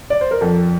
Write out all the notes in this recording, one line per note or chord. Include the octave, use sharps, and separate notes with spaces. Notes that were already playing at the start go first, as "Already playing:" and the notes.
D5
C5
A#4
F2 A4